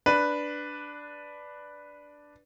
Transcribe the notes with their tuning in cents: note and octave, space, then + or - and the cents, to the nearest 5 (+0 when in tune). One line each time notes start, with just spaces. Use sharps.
D4 +0 B4 +0